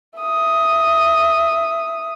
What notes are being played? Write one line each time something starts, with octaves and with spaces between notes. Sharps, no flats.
E5 D#6